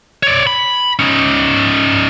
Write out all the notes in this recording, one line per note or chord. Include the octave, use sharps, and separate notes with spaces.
C#5 D5
B5
C#4 D#4